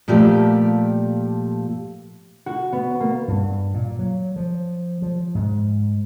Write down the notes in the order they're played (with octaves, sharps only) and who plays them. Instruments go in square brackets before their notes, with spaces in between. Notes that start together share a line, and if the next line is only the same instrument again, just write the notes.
[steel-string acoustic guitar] A#2 F3 A3 G4 D5
[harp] F#4
B3
A#3
[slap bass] G2
A#2
F#3
F3
F3
G#2